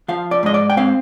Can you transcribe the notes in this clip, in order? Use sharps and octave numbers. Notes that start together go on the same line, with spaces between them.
F3 F5
D5
G#2 D#5
D5
G5
C4 F5